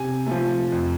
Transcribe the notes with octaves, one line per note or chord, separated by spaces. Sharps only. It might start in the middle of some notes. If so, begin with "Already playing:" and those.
Already playing: C3 G#5
F3 A3
F2